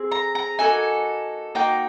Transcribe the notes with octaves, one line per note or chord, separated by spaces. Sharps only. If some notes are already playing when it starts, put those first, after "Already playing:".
Already playing: C4 G#4
A#5
A#5
A#3 D#4 F#4 A4 G#5
A#3 D#4 F#4 G5